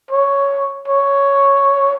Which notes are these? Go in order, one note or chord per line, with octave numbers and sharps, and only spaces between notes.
C#5
C#5